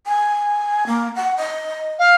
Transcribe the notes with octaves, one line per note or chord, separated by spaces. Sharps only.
G#5
A#3
F#5
D#5
F5